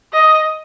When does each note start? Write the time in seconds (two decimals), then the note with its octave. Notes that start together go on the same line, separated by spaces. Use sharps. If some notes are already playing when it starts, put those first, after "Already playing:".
0.13 D#5